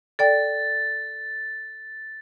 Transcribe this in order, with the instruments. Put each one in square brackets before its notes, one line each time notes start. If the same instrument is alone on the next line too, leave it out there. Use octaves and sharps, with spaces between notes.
[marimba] A4 D5 G5 [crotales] A6